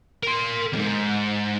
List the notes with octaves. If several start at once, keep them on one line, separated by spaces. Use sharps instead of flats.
A#4 C6
E2 G#2